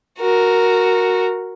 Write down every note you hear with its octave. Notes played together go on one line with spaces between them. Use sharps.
F#4 A#4